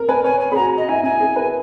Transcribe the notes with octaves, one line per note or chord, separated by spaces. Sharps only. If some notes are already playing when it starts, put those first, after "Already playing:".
Already playing: A#4
B4 G#5
C#5 G#5
G#5
G#4 B5
F#4 A#5
D#5
E4 G#5
E4 G#5
G#4
B4